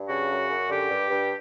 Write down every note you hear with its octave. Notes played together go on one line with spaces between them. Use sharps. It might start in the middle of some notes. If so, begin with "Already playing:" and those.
Already playing: G2
C#3 F#4
F#2
F#2
D3 G4
G2
G2